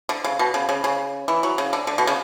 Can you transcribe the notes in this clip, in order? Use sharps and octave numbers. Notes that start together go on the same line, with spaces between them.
D3
C#3
B2
C#3
C#3
C#3
E3
F#3
C#3
D3
D3
B2
C#3